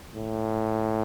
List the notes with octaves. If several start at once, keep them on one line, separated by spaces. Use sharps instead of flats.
A2